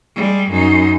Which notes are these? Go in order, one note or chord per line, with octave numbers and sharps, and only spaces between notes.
G3 G#3
F#2 D#4